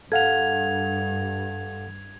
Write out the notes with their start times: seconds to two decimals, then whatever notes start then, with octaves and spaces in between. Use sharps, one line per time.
0.12 G2 A4 F5 F#5 G#6 F7